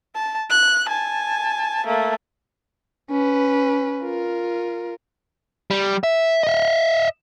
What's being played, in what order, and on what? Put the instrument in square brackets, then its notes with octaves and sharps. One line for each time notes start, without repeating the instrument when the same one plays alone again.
[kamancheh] A5
F#6
G#5 A5
A3 A#3
[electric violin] C#4 B4
F4 A#4
[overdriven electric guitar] G3
E5
D#5 E5